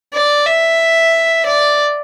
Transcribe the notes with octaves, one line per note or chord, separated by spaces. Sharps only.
D5
E5
D5